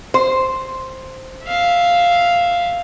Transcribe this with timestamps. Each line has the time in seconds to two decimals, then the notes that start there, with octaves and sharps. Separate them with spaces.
0.14 C5
1.44 E5 F5